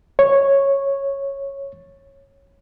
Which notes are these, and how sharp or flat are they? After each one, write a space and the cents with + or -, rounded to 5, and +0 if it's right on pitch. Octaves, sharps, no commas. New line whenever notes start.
C#5 -5